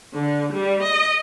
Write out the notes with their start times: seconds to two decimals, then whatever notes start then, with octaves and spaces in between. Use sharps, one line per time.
0.14 D3
0.53 G3
0.83 D#5